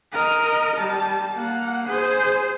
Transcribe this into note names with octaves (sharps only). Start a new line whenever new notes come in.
A#4 D#5
G3 A5
A#3 F#5
G#4 C5